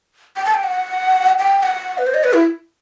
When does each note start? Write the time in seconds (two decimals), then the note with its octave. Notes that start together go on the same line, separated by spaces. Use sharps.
0.36 G5
0.45 A5
0.54 G5
0.64 F#5
1.39 G5
1.58 G5
1.63 F#5
1.98 B4
2.07 C5
2.14 D#5
2.24 B4
2.33 E4